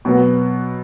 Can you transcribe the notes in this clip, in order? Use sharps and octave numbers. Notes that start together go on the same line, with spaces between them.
B2 F#3 B3